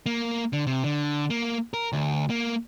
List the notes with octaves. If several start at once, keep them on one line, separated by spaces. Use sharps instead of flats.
A#3
D3
C3
D3
A#3
A#4
D2
A#3